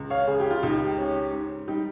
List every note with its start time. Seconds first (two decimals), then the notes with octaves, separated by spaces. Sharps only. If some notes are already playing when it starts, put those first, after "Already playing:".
Already playing: C#2
0.10 C#5 F5
0.27 C#3 G#4
0.40 G4
0.51 F4
0.63 C#2 D#4 G4
0.98 C#4
1.33 G#2
1.67 G3 D#4 G4